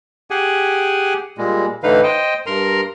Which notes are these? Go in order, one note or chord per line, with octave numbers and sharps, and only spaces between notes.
G4 G#4 F#5 G#5
A#2 G3 G#3
A2 D3 E3 D#4 B4 F5
C5 D#5 G5
G2 A#4 A#5 C6